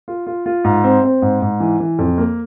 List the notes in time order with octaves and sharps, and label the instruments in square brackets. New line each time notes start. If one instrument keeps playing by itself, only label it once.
[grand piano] F4
F4
F4
G#2
C4
C4
G#2
G#2
E3
E3
F2
A#3